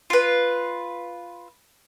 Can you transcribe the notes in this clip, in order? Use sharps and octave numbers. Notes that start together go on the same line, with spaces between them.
F4 B4